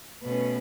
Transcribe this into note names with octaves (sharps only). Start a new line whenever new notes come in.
B2 A3 C#4 B4